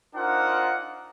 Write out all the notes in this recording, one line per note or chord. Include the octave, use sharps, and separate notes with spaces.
D4 D#4 F4 A#4 C5 F#5